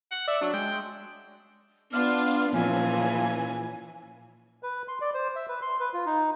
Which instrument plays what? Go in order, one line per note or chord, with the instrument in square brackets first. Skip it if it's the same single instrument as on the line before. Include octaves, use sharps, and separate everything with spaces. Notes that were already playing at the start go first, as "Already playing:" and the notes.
[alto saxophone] F#5
[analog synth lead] D5 [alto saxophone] E5
[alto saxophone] F#3 [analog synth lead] D4
[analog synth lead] G#3 [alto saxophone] G5
[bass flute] B3 [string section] D4 F4 [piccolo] F6
[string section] A#2 C#3 E3 [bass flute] F3 [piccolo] G#5
[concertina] B4
C6
D5
C5
E5
B4
C6
B4
F4
D#4